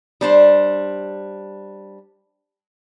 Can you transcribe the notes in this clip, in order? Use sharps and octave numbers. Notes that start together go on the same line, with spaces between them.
G3 D4 C5